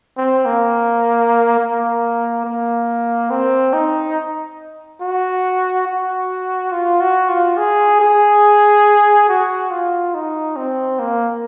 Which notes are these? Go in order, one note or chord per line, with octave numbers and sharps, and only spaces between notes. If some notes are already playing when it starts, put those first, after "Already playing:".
C4
A#3
A#3
A#3
C4
D#4
F#4
F#4
F4
F#4
F4
G#4
G#4
F#4
F4
D#4
C4
A#3